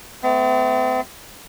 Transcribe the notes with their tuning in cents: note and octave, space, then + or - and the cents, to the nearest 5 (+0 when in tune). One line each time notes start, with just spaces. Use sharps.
A3 +0 C4 -45